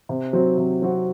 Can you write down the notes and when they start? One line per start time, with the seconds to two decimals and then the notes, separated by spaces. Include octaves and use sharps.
0.09 C3
0.33 F#3 C4 F#4
0.57 C3
0.82 F#3 C4 F#4